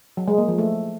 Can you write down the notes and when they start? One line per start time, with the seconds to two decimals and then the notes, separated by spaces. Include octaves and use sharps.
0.17 F#3
0.28 G#3
0.38 A#3
0.48 F3
0.58 A3